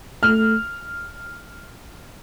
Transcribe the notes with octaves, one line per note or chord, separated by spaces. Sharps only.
A3 F6